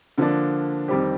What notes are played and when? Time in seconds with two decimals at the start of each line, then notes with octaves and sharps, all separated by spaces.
0.18 D3 F3 A#3 D4
0.88 F2 D#3 G3 C4 G4